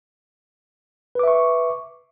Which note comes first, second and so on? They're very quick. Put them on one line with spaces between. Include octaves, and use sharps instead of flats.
B4 D6 E5 C#6